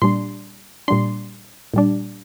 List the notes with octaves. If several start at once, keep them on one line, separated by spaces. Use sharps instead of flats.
A#2 G3 D4 C6
A#2 G3 D4 C6
A#2 G3 D4